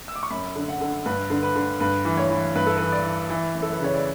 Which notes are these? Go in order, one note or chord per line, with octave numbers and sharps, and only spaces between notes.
E6
D6
C#6
F#2 B5
D3
F#5
D3
G2 B4
D3
B4
D3
G2 B4
E3
C#5
E3
G2 B4
A4
E3 B4
D5
E3
E3
F#2
A4
B4
C#3 C#5
D5